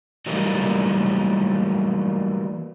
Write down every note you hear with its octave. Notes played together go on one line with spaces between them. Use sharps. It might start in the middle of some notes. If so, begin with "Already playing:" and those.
E3 F#3 G3 A3 A#3 D#4